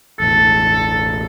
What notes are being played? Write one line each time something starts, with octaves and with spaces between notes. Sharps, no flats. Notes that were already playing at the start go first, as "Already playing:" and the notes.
E1 A1 A4